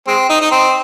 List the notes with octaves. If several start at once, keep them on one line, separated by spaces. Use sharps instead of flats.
G#3 C4
D#4
D#4
C4